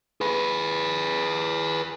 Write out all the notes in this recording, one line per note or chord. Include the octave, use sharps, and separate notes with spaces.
G#4 B4